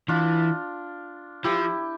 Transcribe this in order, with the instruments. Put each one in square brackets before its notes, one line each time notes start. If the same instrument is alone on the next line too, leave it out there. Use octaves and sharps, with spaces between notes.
[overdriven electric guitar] E3 [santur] D4 F4
[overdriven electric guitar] F3 [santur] E4 G4